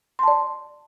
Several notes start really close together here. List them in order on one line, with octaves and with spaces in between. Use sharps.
C6 A5 D5